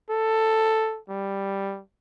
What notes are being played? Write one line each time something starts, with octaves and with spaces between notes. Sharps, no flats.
A4
G3